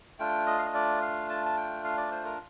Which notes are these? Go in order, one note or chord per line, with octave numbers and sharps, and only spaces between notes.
A3 D4 F4 G5
D#5
F5
D#5
D5
F5
A5
A5
G5
F5
D5
C5
A#4